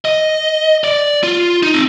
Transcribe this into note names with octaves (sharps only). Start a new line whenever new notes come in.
D#5
D5
F4
D#4
C4